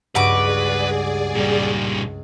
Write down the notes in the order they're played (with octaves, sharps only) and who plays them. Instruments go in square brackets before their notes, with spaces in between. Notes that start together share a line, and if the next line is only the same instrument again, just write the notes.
[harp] C#2 G2 [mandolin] F#4 D6 [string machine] G#4 D5 [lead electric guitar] B4
[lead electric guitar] A#2 G3